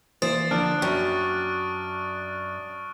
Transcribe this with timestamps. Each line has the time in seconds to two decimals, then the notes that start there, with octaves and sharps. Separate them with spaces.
0.22 E3 A#3 C5 D#6 A6 D7
0.51 D3 F3 A#3 D4 F6 F#6 D7
0.82 F#2 G5 C#6